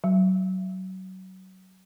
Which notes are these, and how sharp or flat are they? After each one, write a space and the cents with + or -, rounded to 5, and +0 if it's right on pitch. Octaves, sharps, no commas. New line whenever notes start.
F#3 +25